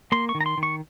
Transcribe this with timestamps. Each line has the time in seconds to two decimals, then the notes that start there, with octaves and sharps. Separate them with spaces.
0.12 A#3 C6
0.29 C#6
0.35 D#3
0.41 A#5
0.46 C6
0.58 D#3
0.63 C#6